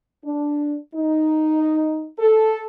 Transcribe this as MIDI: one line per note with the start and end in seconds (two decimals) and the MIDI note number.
0.25 0.76 62
0.95 2.08 63
2.19 2.66 69